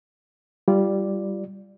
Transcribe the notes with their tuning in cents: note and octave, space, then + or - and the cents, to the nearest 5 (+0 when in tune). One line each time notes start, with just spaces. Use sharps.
G3 -5 F4 -25 D5 +0